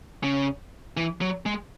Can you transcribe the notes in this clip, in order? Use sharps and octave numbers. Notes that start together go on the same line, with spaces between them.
C#3
E3
F#3
G#3